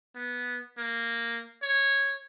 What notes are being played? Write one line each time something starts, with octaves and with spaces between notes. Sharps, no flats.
B3
A#3
C#5